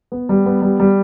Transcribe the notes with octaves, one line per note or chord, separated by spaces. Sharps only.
B3
G3
B3
G3
G3